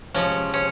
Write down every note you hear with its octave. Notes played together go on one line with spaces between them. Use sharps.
C3 F3 G#3 C#4
C#4